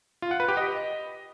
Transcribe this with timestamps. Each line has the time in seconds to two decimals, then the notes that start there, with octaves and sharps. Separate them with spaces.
0.22 F4
0.31 F#5
0.40 B4
0.48 G4
0.57 D#5